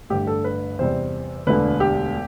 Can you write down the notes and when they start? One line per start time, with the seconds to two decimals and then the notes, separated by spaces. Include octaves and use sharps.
0.10 A1 G2 D3 G4
0.27 A4
0.44 B4
0.79 E2 C3 G3 C5
1.47 E1 D2 D3 B4
1.80 G4